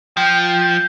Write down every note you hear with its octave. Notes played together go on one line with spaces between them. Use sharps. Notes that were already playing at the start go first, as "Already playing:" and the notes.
F3 G5 G6 C7